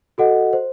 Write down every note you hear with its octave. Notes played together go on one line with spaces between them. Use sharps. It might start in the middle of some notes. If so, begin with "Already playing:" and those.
F#4 A4 D#5 F#5
C5